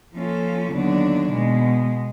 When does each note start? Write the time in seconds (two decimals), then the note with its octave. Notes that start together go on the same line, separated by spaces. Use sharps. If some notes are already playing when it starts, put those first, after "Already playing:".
0.14 F3 A#3 C#4 F4 A4
0.72 D#2 D3 F#3 B3 D4
1.32 B2 G#3 B3